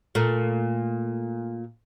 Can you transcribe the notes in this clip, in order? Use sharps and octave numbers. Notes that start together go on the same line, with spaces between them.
A#2 A3